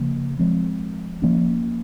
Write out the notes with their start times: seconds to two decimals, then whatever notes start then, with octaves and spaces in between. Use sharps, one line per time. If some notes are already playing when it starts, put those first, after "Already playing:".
Already playing: C#3 F3 A#3
0.39 F3 G#3 C4
1.22 F3 A#3 C#4